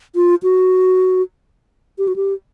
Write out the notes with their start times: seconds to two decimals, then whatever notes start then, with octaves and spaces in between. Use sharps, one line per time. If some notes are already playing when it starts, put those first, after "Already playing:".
0.15 F4
0.43 F#4
1.98 G4
2.08 F#4
2.16 G4